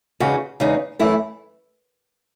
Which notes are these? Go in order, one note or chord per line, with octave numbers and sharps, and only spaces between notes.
E2 C#3 G#3 D#4 F#4
E2 C#3 G#3 D#4 F#4
F#2 E3 A3 E4